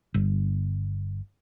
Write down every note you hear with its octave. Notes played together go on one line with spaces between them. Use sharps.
G1